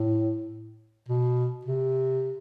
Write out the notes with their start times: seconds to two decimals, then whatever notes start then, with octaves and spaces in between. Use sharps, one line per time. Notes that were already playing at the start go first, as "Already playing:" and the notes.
Already playing: A2
1.08 B2
1.65 C3